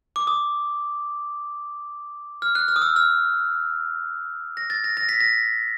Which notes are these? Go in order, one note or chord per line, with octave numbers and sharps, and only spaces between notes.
D6
D#6
F6
F#6
F6
D#6
E6
F6
A#6
A6
A#6
A#6
B6
A#6